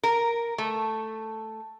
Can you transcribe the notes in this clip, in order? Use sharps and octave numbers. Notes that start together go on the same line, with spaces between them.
A#4
A3